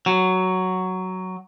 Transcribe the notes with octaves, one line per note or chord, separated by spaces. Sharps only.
F#3